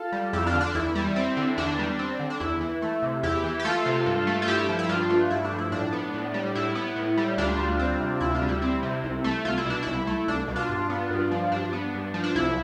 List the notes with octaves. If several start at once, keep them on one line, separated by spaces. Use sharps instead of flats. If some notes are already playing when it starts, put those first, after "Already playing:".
Already playing: F4 A4
G3
F2 E4 G4
D4 F4
D3
D4
E2 E4
G3
C4
D3
E2 D4
G3
C4
D3
D4
E2 E4
E3
A3
C3
E2 E4 G4
E3
G4
A3 F4 A4
C3
G2
A3
F4
G2 E4 G4
F3
E4
G2 D4 F4
A3
G2 E4
D4
F3
E4
A2 D4
B3
A2
G3
A2 E4
B3
A2
G3
D2 D4 F4
G3
C4
C3
D2 E4
D4 F4
G3
E4
C4 E4
C3
C2
A3
C2 F4
E4
B2 D4
C2 E4
A3
C2 D4
B2
D4 F4
G2
B3
G2
F3
G2 D4
B3
G2
F3
D4
C2 E4